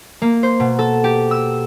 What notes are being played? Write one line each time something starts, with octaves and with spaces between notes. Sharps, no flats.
A#3
C5
B2
A4
G4
E6